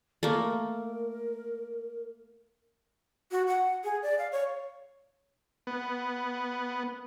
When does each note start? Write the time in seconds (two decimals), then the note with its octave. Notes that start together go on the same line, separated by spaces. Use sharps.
0.23 A3 A#3 A#4
3.31 F#4
3.47 F#5
3.84 G#4
4.02 D5
4.18 F5
4.32 C#5
5.67 B3